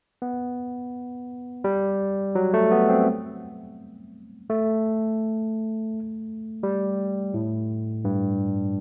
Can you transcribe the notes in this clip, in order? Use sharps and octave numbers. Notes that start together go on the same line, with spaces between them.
B3
G3
F#3
A3
B3
C4
A3
G3
A2
G2